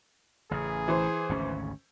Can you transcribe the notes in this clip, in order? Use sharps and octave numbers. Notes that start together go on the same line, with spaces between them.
A1 C#3 G#4
E3 C5
G#1 D2 C#4